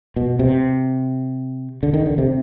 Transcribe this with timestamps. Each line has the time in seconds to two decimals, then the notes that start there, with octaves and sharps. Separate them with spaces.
0.16 B2
0.39 C3
1.83 D3
1.94 D#3
2.06 D3
2.18 C3